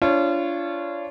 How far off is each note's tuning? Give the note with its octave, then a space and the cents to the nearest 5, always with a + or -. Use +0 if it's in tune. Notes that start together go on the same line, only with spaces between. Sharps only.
D4 -25 F4 -30 C#5 -15